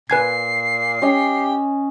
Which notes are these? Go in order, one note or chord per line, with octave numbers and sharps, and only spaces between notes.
A#2 B4 G#5 G#6 C7
C#4 G4 C#5 D#5